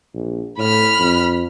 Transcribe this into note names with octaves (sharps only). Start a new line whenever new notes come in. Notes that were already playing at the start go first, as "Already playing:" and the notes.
A#1
A2 B5 F6
F2